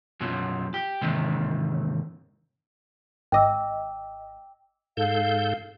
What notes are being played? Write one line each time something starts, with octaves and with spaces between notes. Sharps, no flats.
F#2 B2 F3 F#3
G4
E2 G#2 C3 D#3
G#1 D#5 G5 D6 E6
G#2 A4 F5 G6